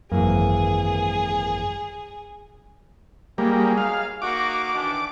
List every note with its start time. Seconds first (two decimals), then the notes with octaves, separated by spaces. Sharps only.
0.12 G#1 F#2 E3 A#3 G#4
3.38 F#3 G3 A#3 D#4 G#4
3.77 F5
4.22 A#3 D#4 F#4 D6
4.74 D#3 E3 D4